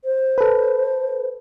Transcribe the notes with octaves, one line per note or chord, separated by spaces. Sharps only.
C5
A4 B4